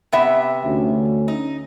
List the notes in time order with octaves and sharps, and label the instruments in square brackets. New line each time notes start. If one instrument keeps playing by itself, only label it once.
[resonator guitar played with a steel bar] C3 B3 E5
[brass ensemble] D2 C#4
[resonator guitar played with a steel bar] D#4